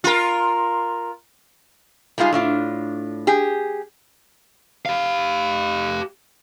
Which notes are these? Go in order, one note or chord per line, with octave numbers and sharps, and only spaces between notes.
F4 A#4
G3 G#3 D#4 F4 G#4
A2 D4 F4
G4 G#4
G4 F5